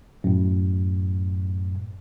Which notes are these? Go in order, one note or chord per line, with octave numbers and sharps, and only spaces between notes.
F#2 A2